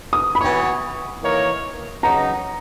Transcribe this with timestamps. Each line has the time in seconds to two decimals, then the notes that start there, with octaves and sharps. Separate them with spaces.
0.13 D#6
0.35 B5
0.40 E3 B3 F#4 C#5 C#6
1.22 E3 A#3 D#4 A#4 C#5
2.03 C#3 F#3 B3 D#4 A#5